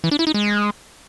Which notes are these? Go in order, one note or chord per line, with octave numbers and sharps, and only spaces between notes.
E3
D4
E4
D#4
G#3